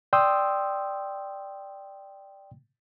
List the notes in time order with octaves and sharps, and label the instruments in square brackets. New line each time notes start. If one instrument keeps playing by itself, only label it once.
[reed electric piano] D5 G5 C6 D#6 E6